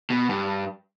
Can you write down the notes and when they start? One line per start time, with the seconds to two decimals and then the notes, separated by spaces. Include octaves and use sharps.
0.10 B2
0.29 G2